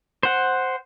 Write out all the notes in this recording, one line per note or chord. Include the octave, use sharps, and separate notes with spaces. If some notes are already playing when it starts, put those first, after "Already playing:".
C5 F#5